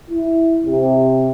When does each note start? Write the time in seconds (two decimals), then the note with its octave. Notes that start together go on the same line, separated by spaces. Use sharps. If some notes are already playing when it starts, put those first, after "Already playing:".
0.10 E4
0.66 C3